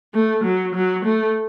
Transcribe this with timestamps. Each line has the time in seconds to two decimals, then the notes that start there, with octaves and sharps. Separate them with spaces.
0.14 A3
0.44 F#3
0.75 F#3
1.05 A3